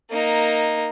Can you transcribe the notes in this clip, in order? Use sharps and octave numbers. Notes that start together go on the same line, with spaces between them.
A#3 D#4